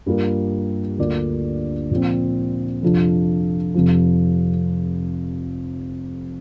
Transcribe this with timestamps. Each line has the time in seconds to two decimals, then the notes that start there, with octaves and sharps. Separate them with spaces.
0.06 G2 G3 A#3 F4 A#4
0.98 D2 D3 A#3 F4 D5
1.91 A#2 F3 C4
2.82 F2 C3 F3 D4 F4
3.74 F1 F2 C3 F3